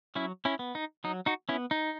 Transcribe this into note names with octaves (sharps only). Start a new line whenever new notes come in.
F#3 C#4 E4
C#4 E4
B3
D#4
F#3 D#4
D#4 F#4
B3 C#4 E4
D#4